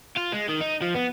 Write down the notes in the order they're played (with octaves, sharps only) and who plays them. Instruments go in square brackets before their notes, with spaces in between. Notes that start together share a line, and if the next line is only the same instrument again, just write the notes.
[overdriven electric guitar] F4
G#3
D#3
D#4
F3
B3